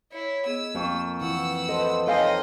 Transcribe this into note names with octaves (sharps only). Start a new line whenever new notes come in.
E4 C#5
B3 G#4 D#5 E6
F2 A#3 C#6
E3 F#5 E6
A4 B4 C5 D#5 C6
D#4 A4 C5 C#5 D#5 F5 G5 G#5